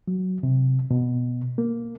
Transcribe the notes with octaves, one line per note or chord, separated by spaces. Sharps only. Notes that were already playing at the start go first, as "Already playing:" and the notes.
F#3
C3
B2
A#3